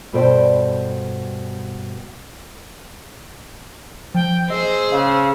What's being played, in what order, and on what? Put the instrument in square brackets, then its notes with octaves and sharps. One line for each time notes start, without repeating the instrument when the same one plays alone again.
[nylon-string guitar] G2 B2 A4 C5 D5 G5
[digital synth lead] F3 [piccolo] G5
[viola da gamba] G#4 C5 [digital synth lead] D#5 [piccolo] E6
[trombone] C#3 [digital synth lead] F5